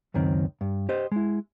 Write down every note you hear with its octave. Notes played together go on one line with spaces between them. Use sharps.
C#2 F#2 D#3 C4
G2
G4 C5 D#5
G#3 E4